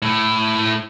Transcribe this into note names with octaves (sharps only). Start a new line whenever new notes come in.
A2 A3